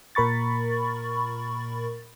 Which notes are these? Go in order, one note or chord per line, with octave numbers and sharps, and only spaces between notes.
A#2 A#4 B5 C#6 A6